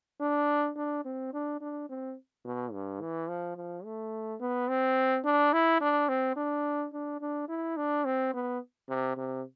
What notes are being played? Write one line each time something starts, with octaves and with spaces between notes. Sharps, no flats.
D4
D4
C4
D4
D4
C4
B2
G2
E3
F3
F3
A3
B3
C4
D4
E4
D4
C4
D4
D4
D4
E4
D4
C4
B3
C3
C3